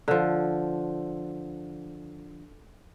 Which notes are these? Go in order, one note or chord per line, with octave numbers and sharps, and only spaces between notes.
D3 F3